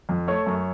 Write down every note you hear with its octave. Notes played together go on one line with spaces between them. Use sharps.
F2
A3 C#5
F#2